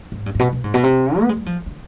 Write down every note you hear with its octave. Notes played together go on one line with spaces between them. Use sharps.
G#2
G2
G#2
B2
B2
G#2
B2
C3
B3
G#3
G3
F3
D3